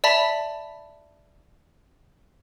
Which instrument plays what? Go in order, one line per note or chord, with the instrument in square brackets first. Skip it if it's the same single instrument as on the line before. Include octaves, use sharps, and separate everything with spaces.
[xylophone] D5 E5 A5 B5 B6 F7